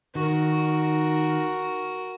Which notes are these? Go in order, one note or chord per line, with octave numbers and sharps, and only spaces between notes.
D#3 F#4 A#4